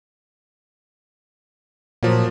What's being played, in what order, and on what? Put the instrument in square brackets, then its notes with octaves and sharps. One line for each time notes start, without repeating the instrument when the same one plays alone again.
[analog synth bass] A#2 [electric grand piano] F3 F#3 A#3